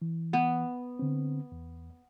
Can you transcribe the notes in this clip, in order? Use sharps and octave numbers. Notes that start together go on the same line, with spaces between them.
E3
B3
D3 C4
E2